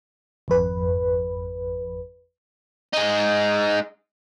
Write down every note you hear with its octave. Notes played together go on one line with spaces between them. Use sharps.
G#1 F2 B4
G#3 D#4